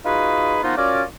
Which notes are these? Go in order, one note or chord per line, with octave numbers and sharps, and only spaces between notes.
D#4 F4 F#4 G#4 B4
F3 A#3 B3 D#4 F4 F#4
C#4 F4 F#4 A#4 D5